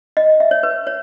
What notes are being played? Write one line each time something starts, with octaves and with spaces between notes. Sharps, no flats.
D#5
E5
C#5
B4
C#5